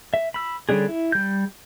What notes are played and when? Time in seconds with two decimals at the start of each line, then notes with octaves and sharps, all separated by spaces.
0.14 E5
0.34 B5 E6
0.69 D3 G3 C#4 D4 G#4
0.88 E4
1.12 G3 G6